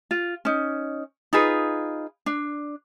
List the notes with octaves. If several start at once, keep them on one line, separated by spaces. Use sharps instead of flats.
F4
C#4 D#4
D#4 F4 G#4 B4
D4